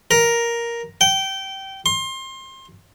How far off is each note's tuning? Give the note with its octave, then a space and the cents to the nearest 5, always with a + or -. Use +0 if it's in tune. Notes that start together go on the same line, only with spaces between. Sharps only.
A#4 +5
G5 -20
C6 +25